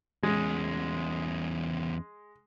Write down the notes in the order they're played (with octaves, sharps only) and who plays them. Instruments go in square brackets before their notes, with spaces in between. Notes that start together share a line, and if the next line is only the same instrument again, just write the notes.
[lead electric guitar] E2 C#4 [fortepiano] G#3